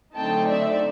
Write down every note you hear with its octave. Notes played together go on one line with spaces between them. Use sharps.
D3 F#3 A3 C4 D#4 G5 A5
D5 E5